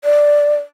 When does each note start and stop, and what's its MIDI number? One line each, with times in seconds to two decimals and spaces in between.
0.04 0.55 74